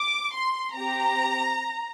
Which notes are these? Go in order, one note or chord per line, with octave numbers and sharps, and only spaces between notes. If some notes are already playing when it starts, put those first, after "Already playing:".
Already playing: D6
C6
C4 G4 A#5